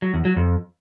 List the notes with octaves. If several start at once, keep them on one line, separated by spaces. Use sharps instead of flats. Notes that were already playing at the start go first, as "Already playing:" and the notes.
F#3
E2
F#3
F2